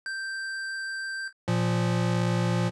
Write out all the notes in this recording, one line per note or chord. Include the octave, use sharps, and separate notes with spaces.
G6
A#2 F3